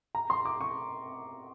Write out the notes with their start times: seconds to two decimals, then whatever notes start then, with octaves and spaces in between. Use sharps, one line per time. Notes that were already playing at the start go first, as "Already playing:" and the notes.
0.15 A#5
0.30 C6
0.45 D6
0.61 C#6